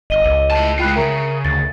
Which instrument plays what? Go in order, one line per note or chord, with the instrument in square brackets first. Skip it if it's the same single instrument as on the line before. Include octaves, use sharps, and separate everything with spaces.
[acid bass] G1 [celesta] D#5 D#7 G7
[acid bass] C#2
[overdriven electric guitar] E4 A5
[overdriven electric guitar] G#3 F4 [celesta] G5 B5 F#6
[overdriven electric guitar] C#3 [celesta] A#4 E5 A#5
[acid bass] D2 [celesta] A6